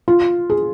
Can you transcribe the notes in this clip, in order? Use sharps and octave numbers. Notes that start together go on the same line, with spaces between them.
F4
G#4